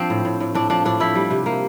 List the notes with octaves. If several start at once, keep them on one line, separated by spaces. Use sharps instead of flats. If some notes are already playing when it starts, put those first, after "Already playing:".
Already playing: F3 C4 D4
A2
A2
A2
A2 D4
F3 D4
A2 D4
F3 E4
G3
C3
A#3